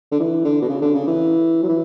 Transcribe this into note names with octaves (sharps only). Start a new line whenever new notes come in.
D3
E3
D3
B2
C#3
D3
C#3
E3
F#3
E3